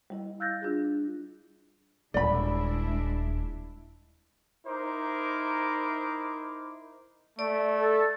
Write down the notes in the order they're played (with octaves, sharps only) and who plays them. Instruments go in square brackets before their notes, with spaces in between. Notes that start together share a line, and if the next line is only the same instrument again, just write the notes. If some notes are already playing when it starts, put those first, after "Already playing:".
[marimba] G3 E4 D#5
F5 E6 F#6 G6 A6 A#6
D4 F4 G#4
[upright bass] D#1 [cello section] G#3 D4 E4 [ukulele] D5 B5
[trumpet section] D#4 E4 A#4 C5 D6
[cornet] A3 [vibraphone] D5
[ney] A4